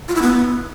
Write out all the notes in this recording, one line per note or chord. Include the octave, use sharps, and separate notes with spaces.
F4
E4
B3